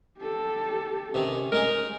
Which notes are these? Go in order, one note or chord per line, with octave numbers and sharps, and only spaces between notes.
G4 A4
C3 D#3 C#4
G#3 D#4 G#4 A#4